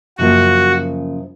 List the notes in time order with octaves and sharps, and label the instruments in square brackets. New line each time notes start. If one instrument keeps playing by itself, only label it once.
[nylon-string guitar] F#2 C#3 F3 A#3 [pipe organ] F#4